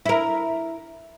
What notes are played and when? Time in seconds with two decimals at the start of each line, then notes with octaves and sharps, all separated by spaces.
0.06 E4 A#4